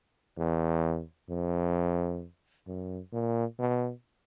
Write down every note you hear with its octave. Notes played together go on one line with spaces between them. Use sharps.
E2
F2
F#2
A#2
B2